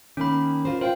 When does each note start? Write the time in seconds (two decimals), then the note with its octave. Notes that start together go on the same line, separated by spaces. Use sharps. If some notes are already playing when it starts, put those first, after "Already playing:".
0.17 D#3 A#3 C#4 B5
0.65 F4 A#4 C5
0.81 F4 C5 F5 G5